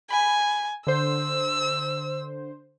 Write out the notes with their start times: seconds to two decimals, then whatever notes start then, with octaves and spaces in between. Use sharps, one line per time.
0.10 G#5 B5
0.87 D3 C5 E6